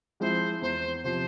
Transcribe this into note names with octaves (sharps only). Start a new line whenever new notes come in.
F3 G#3 C4 E4 C5
E2 C5
C3 F3 C5